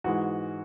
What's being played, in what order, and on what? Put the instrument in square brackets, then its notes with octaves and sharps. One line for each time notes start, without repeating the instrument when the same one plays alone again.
[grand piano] G#2 E3 G#3 F#4